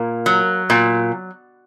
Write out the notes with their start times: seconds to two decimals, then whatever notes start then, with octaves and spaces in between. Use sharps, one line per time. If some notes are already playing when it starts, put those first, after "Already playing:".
Already playing: A#2 A#3 A#4
0.26 F#3
0.70 A#2